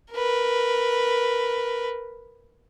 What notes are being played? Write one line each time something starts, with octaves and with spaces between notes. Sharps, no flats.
A#4 B4